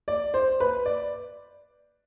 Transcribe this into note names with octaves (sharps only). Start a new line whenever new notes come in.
D5
C5
B4
D5